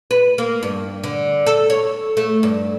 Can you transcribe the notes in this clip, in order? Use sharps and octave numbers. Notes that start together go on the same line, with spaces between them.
B4
A#3
G2
D3
A4
C#5
A3
G2